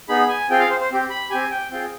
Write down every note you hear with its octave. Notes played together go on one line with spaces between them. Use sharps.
B3 D#4 G#4 B5
G#5
C4 F4 G#4 G5
F5
C5
C5
C4 G4
B5
C4 G4 G#5
G5
C4 F4 G#4 G5